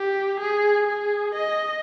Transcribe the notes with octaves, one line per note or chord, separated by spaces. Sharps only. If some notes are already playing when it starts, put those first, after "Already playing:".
Already playing: G4
G#4
G#4
D#5